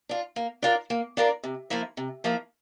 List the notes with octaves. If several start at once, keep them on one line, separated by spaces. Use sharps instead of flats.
D4 F4
A#3
D4 F4 A#4 D5
A#3
D4 F4 A#4 D5
C3
F3 A#3 E4 A#4
C3
F3 A#3 E4 A#4